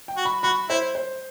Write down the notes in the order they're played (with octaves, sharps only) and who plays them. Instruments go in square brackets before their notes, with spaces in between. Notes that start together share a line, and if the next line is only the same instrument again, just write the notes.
[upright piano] G5
[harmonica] F#4
[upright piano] B5
[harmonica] F#4 [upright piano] B5
[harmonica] E4 [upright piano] C5
[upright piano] C5